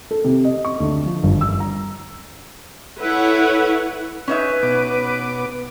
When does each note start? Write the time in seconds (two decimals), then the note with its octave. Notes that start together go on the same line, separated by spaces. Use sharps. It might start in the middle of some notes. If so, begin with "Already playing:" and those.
0.11 A4
0.24 C3
0.44 D#5
0.65 C#6
0.80 D2
1.06 F3
1.23 G1
1.41 E6
1.60 A#5
3.01 E4 A4 B4 C#5 E5 F#5
4.28 C#4 D#4 B4 E5
4.63 B2 B3 D6